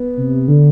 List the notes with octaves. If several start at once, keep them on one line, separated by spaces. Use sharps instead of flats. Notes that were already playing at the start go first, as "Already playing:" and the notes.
Already playing: B3
C3
D3